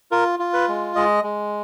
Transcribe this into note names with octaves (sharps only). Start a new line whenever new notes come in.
F4 A#4
F4
B4
G#3
G#3 D#5
G#3